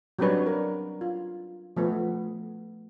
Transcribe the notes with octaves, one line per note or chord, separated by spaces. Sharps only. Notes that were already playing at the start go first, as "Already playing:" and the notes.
F#3 G3 C4 D4 B4 C#5
A#4
F4
F3 A3 B3